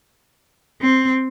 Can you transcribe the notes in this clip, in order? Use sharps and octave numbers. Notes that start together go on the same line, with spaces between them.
C4